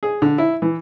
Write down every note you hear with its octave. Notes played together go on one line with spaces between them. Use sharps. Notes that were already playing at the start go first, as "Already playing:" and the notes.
G#4
D3
E4
E3